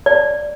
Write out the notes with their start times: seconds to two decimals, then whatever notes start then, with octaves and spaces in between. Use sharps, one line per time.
0.06 D5